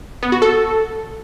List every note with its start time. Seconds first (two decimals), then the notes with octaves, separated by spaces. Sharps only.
0.23 B3
0.32 F#4
0.42 A4